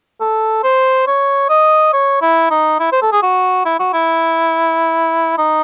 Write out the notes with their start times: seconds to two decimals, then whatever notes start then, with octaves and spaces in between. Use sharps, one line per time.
0.21 A4
0.63 C5
1.07 C#5
1.50 D#5
1.93 C#5
2.22 E4
2.51 D#4
2.79 E4
2.92 C5
3.02 A4
3.12 G#4
3.22 F#4
3.65 E4
3.79 F#4
3.93 E4
5.38 D#4